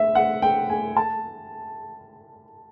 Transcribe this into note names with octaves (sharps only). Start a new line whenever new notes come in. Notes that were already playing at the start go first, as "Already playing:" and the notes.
Already playing: E5
F#5
G5
G#5
A5